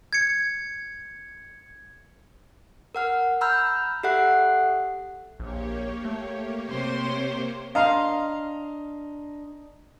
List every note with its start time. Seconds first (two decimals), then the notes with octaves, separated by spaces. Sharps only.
0.13 G#6 C#7
2.95 A#4 F#5 F6
3.41 A#5 B5 E6 F6 G6
4.03 G4 A4 E5 F#5 F#6
5.40 A#1 A#3 G4 C#5
6.05 A3
6.68 C3 C5 C6
7.75 D4 D#5 F5 A#5 C6